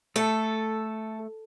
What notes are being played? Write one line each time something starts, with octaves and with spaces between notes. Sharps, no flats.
A3 A4